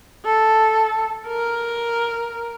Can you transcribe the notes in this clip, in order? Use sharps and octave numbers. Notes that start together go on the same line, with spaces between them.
A4
A#4